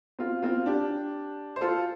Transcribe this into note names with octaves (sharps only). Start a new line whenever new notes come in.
C4 F4
C4 F4
D4 G4
C5
F4 A4